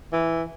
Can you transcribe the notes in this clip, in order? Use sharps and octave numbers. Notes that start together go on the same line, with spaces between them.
E3